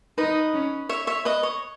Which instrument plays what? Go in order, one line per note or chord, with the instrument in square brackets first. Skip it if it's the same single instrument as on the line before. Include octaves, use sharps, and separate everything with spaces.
[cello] D#4 [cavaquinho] B4 D#5
[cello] C#4
[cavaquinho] C#5 E5
C#5 E5
B4 D#5
C#5